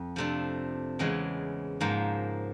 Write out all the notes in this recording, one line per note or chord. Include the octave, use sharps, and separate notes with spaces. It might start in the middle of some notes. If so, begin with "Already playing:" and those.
Already playing: F2
C3 F3 A3 D4
E2 C#3 E3 G#3
G#2 F3 A#3